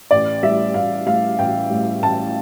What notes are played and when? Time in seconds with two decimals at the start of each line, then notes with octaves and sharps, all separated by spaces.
0.11 A1 D5
0.43 A2 G3 E5
0.74 A1 F5
1.06 A2 G3 F5
1.38 A1 G5
1.70 A2 G3
2.02 A1 A5